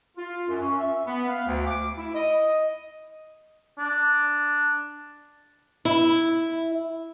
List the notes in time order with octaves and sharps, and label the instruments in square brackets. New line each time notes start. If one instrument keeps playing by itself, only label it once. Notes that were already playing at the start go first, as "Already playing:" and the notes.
[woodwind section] F4
F#2
C#4
E5
B3
F5
D2
D6
E4
D#5
[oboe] D4
[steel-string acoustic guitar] E4